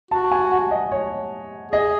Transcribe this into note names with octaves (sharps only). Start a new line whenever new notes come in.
F#4 A5
G#5
F#5
D#5
C#5
G#4 D#5